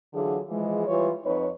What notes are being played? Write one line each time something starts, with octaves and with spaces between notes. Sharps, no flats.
D3 E3 F#3 F4 G#4
E3 F3 G#3
E3 G3 F4 B4 C#5
F2 D#4 B4 C#5